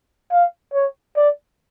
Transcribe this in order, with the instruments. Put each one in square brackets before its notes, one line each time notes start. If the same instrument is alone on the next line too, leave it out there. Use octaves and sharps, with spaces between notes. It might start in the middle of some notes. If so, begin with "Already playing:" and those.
[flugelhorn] F5
C#5
D5